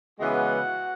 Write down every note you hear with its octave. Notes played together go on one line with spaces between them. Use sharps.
C#3 E3 G#3 B3 F#4 F#5